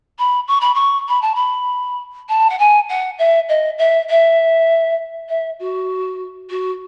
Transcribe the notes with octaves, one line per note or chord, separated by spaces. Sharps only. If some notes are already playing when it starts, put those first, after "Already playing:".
B5
C#6
B5
C#6
B5
A5
B5
A5
F#5
G#5
F#5
E5
D#5
E5
E5
E5
F#4
F#4